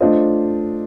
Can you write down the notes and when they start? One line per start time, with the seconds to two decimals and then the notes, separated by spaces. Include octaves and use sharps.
0.01 A3 D4 F4 C5 D#5